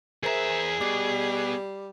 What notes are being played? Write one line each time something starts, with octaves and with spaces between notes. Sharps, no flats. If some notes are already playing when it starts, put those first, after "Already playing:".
E2 G#4 A#4 C5 E5 A#5
B2 G3 D6 C7